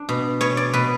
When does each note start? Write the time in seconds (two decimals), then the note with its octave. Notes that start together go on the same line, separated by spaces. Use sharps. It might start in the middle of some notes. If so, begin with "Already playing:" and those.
Already playing: D4
0.09 B2
0.41 B2 C#5
0.57 D5
0.73 B2 B4